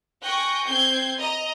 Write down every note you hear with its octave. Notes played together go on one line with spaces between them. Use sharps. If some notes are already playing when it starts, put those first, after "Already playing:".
G5 G#5 C#6 F#6 G6 A#6
C4 G6 G#6 C7
D#5 A#5